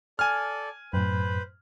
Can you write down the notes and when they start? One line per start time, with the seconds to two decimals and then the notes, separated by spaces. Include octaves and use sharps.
0.19 A4 D5 G#5 F6
0.93 F#2 A2 B4 C5 B5